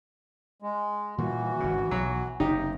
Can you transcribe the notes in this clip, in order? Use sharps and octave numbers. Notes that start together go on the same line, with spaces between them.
G#3
A#2 D#3 E3 G3 F#4
G#1 C#3
B1 F#3
F#1 C3 D#4 G4